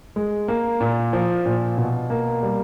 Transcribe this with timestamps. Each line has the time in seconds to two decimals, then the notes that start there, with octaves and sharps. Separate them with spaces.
0.16 G#3
0.48 A#3
0.81 A#2
1.13 F3
1.46 A#2
1.78 B2
2.10 A#3
2.43 G3